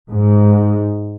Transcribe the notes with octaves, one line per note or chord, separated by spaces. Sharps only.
G#2